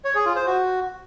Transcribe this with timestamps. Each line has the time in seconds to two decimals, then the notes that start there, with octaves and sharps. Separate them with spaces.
0.05 C#5
0.15 G#4
0.25 F4
0.36 C5
0.46 F#4